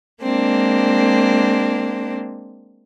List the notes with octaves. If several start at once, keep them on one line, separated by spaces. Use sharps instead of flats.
G#3 A#3 C4 D4